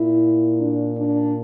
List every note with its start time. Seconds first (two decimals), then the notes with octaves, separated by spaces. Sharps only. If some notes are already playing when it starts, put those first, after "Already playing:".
Already playing: A#2 E4
0.60 D4
0.97 D4